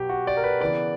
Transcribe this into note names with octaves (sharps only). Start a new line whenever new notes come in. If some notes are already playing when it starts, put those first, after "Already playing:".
Already playing: B2 F#3 B3 G4
F#4
D5
A#4
B4
C#3 E3 B3 D5